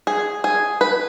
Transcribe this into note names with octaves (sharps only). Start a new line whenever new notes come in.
G#4
G#4
B4